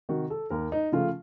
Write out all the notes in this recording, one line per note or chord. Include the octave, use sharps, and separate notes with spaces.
C3 D#3 F#4
A4
D#2 A#4
D#4
C#3 F3 A3 F4